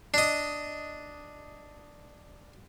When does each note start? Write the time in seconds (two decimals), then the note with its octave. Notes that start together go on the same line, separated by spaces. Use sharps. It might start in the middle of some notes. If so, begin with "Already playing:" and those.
0.14 D4 D#5